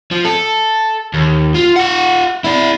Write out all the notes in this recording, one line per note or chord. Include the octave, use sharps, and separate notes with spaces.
F3
A4
D#2
F4
F4 F#5
E4 D5